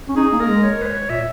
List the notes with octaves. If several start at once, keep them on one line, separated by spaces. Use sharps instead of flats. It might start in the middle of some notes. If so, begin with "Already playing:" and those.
C#4
D#4 G#4
A#3
A#4
G#3
C#5
B4
C#5
A#2 E5